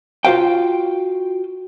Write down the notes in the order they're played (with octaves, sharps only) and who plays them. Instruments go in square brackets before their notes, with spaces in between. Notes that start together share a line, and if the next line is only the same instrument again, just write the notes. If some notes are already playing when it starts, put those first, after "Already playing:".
[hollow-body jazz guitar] F4 F#4 G#4 C5 F5 G5